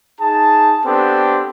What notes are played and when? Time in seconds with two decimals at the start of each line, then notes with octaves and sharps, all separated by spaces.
0.21 D#4 G#4 A5
0.85 B3 C4 D4 G4 A4